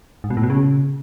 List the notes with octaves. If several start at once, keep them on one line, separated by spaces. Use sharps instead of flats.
G#2
B2
A2
B2
C#3